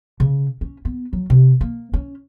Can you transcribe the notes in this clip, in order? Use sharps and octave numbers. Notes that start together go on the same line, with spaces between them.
C#3
C#4
B3
F#3
C3
A#3
C#4